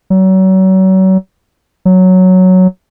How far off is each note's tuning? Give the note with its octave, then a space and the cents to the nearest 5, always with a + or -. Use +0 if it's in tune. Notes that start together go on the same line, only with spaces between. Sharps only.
F#3 +35
F#3 +0